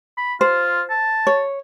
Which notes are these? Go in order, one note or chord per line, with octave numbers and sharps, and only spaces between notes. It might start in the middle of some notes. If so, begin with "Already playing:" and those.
B5
F4 C5
A5
C#5